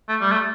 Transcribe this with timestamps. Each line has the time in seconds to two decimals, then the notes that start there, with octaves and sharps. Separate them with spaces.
0.09 A3
0.21 G3
0.31 A3